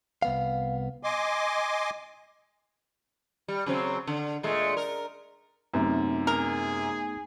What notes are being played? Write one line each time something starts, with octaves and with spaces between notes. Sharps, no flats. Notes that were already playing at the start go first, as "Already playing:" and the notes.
C2 B3 F5
D#5 G#5 C6 D6
G3
C#3 F#3 C4
D3
A#2 G#3 A3
A#4
F#2 C3 A3 B3 D#4
G#4 A#4